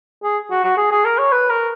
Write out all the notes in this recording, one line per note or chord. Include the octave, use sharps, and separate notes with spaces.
G#4
F#4
F#4
G#4
G#4
A#4
C#5
B4
A#4